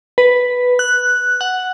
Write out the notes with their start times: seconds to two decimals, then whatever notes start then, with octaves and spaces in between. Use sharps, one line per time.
0.18 B4
0.79 F#6
1.41 F#5